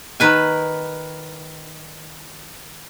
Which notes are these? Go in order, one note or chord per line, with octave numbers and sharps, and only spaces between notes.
D#3 B4 G#5